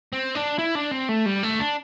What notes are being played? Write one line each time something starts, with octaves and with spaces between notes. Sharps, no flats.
C4
D4
E4
D4
C4
A3
G3
A3
D4